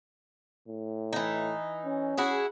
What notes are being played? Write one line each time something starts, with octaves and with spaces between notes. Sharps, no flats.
A2
E3 D#4
C#4
E4 F#4 G#4